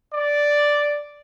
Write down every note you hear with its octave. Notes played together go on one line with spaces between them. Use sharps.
D5